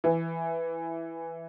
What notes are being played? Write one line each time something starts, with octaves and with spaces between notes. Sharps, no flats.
E3